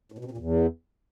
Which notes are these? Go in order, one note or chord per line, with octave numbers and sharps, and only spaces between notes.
A2
B2
C3
A#2
E2